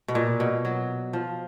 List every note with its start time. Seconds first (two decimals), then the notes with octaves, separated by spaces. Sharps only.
0.08 B2
0.15 A#2
0.40 B2
0.65 F#3
1.13 F3